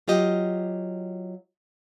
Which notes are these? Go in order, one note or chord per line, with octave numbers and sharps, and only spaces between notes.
F#3 F4 G4 D#5